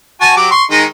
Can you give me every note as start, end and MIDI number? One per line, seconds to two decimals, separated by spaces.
0.21 0.33 66
0.21 0.33 80
0.21 0.33 81
0.37 0.48 54
0.37 0.48 67
0.37 0.48 86
0.51 0.63 84
0.51 0.63 85
0.71 0.84 51
0.71 0.84 56
0.71 0.84 63